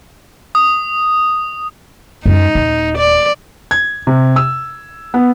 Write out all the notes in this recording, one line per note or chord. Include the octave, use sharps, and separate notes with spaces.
D#6
F#2 G#3 D#4
D#1
D5
G#6
C3
E6
B3